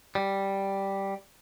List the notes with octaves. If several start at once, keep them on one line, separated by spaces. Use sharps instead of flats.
G3